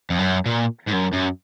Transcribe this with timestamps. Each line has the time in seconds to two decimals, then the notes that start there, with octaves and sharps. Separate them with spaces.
0.10 F2
0.19 F#2
0.46 A#2
0.87 G#2
0.92 F#2
1.13 F#2